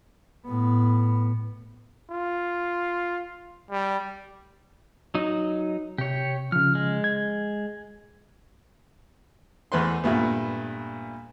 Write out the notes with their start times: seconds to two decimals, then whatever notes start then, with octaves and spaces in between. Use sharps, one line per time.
0.47 A2 B3
2.11 F4
3.71 G3
5.14 F#3 D#4
5.98 C3 G4 C#5
6.52 C#3 F3 F6
6.75 G#3
7.04 G#6
9.72 E2 A3 B4 C5 C6
10.04 G2 A#2 A3 B3